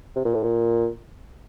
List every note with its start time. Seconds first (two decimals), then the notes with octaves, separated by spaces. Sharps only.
0.16 C3
0.25 A#2
0.34 A2
0.43 A#2